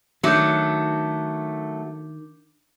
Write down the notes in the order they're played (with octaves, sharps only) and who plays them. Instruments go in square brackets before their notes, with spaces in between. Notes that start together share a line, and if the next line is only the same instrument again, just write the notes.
[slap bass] D#3 [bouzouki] F#3 A3 [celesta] D4 D6 G6